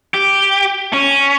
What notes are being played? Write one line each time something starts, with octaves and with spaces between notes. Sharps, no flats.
G4
C#4